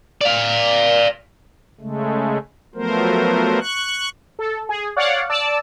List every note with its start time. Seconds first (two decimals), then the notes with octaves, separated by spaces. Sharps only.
0.21 D5 F5
1.80 C#3 G#3 A3
2.75 F3 F#3 A3 B3 A#4 C5
3.59 C#6 F#6
4.39 A4
4.69 G#4
4.96 C#5 D5 F5 F#5
5.29 D5 A5 E6